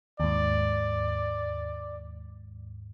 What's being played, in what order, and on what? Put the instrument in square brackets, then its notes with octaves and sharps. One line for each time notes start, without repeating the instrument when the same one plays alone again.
[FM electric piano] D#2 G#2 [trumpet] D5